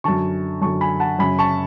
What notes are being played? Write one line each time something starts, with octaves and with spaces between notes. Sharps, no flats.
F#2 D3 A5 C#6
F#2 D3 A5 C#6
G#5 B5
F#5 A5
F#2 C#3 G#5 B5
A5 C#6